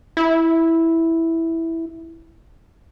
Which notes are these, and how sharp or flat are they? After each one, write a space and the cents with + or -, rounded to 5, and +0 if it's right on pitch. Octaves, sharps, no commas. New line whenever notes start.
E4 -5